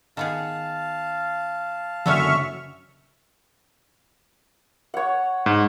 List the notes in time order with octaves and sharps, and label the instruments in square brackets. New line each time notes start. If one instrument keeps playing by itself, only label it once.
[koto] D#3 B3 G#4 [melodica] F5 A5
[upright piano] F#1 F#2 [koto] D3 B3 C#4 [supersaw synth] E5 C#6 F6
[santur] C#5 F#5
[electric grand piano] G#2